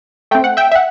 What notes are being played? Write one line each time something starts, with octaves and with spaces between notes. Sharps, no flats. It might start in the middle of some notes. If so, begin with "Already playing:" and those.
A3 C4 G5
F#5
E5 G5
E5
F#5